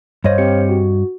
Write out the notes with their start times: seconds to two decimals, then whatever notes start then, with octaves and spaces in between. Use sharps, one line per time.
0.24 G2 C5 C#5 D#5 F5
0.38 C4 G4 C#7
0.69 F#4